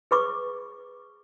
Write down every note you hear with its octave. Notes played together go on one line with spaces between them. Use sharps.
G#4 B4 C#6 D6